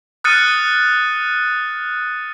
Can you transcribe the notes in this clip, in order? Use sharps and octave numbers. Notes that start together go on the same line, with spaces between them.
D#6 F6 F#6 A6 C#7 D#7